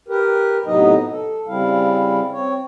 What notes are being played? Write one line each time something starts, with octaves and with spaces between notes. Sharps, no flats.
G4 A#4 B4
A2 C3 F#3 B3 D#4 D#5
A4
C#3 G3 C4 E4 F5
C4 C#5